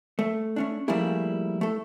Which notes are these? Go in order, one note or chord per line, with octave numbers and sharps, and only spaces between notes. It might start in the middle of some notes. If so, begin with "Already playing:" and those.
A3
A3 C#4 D4
F3 G3 A3 A#3 E4 G#4
A3 A4